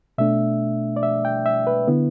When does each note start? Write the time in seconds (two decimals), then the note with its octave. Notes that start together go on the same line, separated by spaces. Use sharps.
0.18 B2 A3 D4 E5
0.96 D5
1.03 E5
1.25 G5
1.46 E5
1.67 B4
1.88 D3 B3 E4